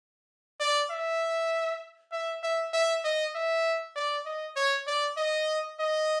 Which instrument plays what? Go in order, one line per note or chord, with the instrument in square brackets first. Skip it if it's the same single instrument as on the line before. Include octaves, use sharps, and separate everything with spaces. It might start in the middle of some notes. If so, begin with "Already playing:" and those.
[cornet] D5
E5
E5
E5
E5
D#5
E5
D5
D#5
C#5
D5
D#5
D#5